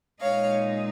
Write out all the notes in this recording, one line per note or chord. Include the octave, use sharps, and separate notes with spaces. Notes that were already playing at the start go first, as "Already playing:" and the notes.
A#2 G#3 D#4 C#5 F5